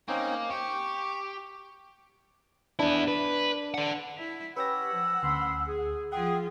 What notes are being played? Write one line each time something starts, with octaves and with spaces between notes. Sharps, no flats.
A#3 C4 C#4 D#4
G4 C#6
B3 D4 E4
B4
D5 F#5
E4
C#4 G4 B4 C#5 F#5 G5 E6 A#6
F3
D2 C#4 B5 C6
G#4
F3 F4 G#4 F#5 G5